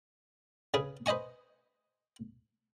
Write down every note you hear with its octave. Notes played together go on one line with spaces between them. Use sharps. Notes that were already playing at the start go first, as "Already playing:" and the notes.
C#3 G#4 B4
B4 C5 D#5 G#5 C#6